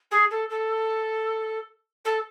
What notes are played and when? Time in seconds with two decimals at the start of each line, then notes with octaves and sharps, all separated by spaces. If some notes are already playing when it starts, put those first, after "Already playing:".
0.11 G#4
0.30 A4
0.49 A4
2.04 A4